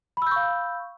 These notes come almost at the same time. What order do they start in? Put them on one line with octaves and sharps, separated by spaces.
B5 E6 G6 C#6 F5